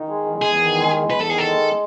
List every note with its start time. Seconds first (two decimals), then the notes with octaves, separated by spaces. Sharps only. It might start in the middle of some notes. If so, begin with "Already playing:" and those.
Already playing: D#3
0.08 G#3
0.25 E2
0.41 E2 G#4
0.59 D#3
0.76 G#3
0.93 E2
1.10 E2 B4
1.20 A4
1.28 D#3 G#4
1.38 A4
1.45 G#3